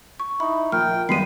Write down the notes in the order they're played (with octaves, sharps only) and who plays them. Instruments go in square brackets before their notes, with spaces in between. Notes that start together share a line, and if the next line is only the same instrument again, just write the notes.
[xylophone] C#6
[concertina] D#4 [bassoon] E4 [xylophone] B5
[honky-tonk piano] A#1 [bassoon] A#4 [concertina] G5 [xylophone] F6
[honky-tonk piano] F#2 G3 A#3 [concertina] G#3 B3 B5 [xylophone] C7 D#7